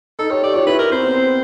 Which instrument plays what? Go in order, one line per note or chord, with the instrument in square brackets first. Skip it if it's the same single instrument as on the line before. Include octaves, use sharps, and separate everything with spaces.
[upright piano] D#4 [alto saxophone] A4
[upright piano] G4 [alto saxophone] C#5
[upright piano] G4 [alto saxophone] D5
[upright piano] F4 [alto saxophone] C#5
[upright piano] E4 [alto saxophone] B4
[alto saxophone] A#4
[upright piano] C4 [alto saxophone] C5
[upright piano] B3
C4